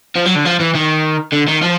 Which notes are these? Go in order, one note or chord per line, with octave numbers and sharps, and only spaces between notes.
F3
F#3
D3
F3
E3
D#3
D3
D#3
F3